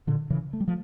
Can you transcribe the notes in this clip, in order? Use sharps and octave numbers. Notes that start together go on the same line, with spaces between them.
A#2 D3
C#3 E3
A3
G3
F3 A3